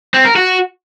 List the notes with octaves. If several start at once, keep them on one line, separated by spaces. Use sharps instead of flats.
C4
A#4
F#4